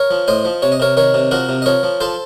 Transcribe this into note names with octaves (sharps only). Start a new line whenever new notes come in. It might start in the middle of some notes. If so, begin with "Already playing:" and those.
Already playing: A#4 C#5
F3
A2 C5 D#5
F3
C3 C#5
D#5
C3 A#4 C#5
D#3 A#4 C#5
C3
F3 F#4 A#4
C3
D#5
F3 A#4 C#5
F3
F3 A4 C5